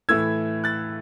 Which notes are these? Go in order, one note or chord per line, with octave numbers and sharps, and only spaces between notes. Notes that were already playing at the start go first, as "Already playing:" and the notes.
A2 E3 A3 E4 E6 G#6
F#6 A6